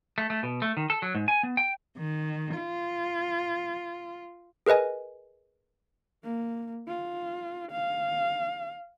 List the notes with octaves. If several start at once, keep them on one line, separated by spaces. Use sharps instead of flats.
A3
A3
B2
A3
D#3
A4
F#3
G#2
G#5
B3
G5
D#3
F4
G#4 A#4 B4 D#5 G#5
A#3
F4
F5